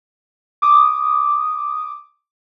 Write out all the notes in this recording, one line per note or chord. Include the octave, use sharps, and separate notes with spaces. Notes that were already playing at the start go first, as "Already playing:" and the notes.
D6 D#6